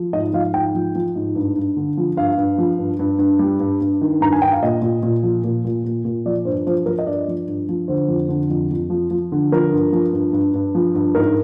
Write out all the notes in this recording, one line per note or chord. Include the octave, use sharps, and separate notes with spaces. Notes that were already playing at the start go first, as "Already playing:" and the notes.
Already playing: F3
G#2 D#5
F3 F5
G#2 G5
F3
F3
G#2
G2
G2
D3
F3
G2 F5
G2
F3
G2
G2
G2
G3
G2
G2
D#3
G2 A#5
G#5
G2 G5
F5
A#2 D#5
A#2
A#2
F3
A#2
A#2
A#2
A#2
F3 D5
G2 C5
F3 C5
F3 A#4
D#5
G2 D5
F3
G2
F3
D3 C5
F2
D3
F2
F2
F3
F3
D3
F3 A#4
G2
F3
G2
G2
G2
F3
G2
G#2 A#4